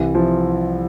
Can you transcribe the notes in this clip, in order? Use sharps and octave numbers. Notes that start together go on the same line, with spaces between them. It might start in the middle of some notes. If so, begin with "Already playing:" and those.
Already playing: C2 E3
F3